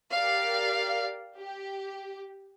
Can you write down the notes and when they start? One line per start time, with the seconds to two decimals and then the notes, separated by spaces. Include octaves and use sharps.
0.12 G4 A#4 D5 F5
1.36 G4